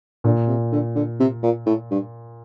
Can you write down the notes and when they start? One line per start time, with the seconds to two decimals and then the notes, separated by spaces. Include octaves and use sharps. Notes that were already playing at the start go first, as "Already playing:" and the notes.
0.24 A#2 D3
0.48 C3
0.72 D3
0.95 D3
1.20 C3
1.43 A#2
1.66 A2
1.91 G2